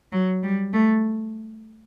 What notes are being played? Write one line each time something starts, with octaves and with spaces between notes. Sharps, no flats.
F#3
G3
A3